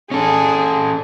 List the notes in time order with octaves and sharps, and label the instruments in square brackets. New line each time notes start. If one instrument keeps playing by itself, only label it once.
[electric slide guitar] C#4 A4 [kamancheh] G#4